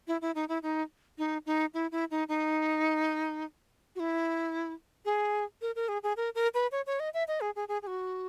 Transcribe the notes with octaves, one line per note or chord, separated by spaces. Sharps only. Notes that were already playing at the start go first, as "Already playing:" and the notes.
E4
E4
D#4
E4
D#4
D#4
D#4
E4
E4
D#4
D#4
F#4
E4
G#4
A#4
A#4
G#4
G#4
A#4
A#4
B4
C#5
C#5
D#5
E5
D#5
G#4
G#4
G#4
G#4
F#4